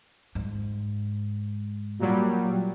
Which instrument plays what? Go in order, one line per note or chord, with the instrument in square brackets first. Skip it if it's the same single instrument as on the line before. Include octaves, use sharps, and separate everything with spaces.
[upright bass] G#2
[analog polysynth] A#2 F#3 G3